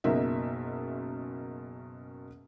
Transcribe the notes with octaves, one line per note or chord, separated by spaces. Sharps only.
F#1 B2 A#3 D#4 E5